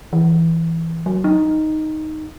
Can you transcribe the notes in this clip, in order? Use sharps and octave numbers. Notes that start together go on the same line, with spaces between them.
E3
F#3
D#4